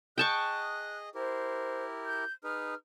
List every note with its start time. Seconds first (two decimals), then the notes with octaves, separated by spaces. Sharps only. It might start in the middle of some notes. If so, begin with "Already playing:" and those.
0.18 G#4 D#5 G5 A5 C#6 F#6
1.15 E4 G4 A#4 C5
2.06 G6
2.44 D#4 G#4 B4 F6